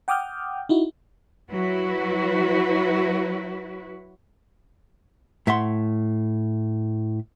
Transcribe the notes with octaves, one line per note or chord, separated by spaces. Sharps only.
F#5 G5 D6 D#6 F6 G6
D#4 E4 F#4
F#3 E4 F#4 B4
A2 E5 F#5 C6